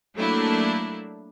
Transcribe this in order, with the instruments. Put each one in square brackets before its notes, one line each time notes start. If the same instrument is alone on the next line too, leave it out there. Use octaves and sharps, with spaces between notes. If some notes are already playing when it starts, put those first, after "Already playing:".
[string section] F#3 A3 A#3 D4 E4